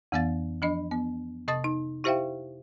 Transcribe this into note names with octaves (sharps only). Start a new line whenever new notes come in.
F2 E3 B3 F5 A6
F3 D4 D#5
B3
C3 D#5 A5 D#6 A6
D#4
E4 G4 C5 E5 F5 G5